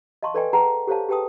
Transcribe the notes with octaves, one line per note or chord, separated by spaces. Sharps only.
D#5 F5 A5 C6 C#6
A4 B4 D5 D#5 G5 G#5
G#4 B4 F#5 G5 A5 A#5
G4 A4 C5 C#5 F5 A5
G4 G#4 B4 G5 A5 D#6